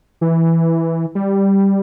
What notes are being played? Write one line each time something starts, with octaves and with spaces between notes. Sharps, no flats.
E3
G3